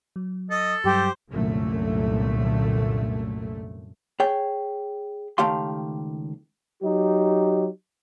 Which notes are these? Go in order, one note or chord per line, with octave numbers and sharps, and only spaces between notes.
F#3
A4 D#5
G2 F#3 G3 G4 C5
C2 F#2 A#2 D3 A3
G#4 C#5 G5
C#2 D#3 A3 G4 F5 C6
F#3 D#4 G4